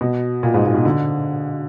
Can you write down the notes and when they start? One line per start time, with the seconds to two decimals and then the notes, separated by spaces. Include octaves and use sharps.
0.01 B2
0.43 A#2
0.54 G#2
0.65 A#2
0.75 B2
0.85 D3